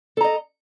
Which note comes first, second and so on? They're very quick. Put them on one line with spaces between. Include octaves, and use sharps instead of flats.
A4 A#5 D#5